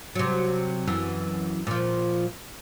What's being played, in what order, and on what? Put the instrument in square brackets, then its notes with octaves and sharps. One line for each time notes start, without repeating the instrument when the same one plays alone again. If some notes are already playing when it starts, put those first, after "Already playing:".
[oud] C3 F#3
F#2 E3
A#2 F3